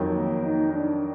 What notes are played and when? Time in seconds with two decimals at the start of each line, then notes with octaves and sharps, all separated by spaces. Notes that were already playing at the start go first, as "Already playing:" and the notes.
Already playing: F2 D#3 F#3
0.12 A#3
0.43 D#4
0.73 D4